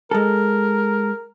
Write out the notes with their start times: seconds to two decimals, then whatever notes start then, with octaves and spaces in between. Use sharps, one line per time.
0.11 G#3 A4 A#4